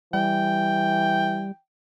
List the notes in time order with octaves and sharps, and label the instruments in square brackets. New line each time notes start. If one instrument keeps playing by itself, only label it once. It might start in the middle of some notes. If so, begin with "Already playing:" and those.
[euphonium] E3 [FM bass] G3 [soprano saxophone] G5